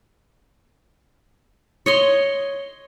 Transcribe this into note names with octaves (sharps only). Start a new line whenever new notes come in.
C#5 D#5 C6